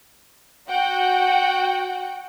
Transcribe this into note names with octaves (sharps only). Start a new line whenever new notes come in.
F#4 F#5 G5